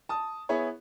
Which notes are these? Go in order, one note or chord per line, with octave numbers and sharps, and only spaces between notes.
A5 D#6
B3 E4 G#4 C#5